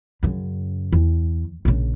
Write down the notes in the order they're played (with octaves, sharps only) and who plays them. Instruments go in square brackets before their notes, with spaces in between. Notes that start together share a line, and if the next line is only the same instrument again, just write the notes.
[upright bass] F#2 C#3
E2
A#1 C#3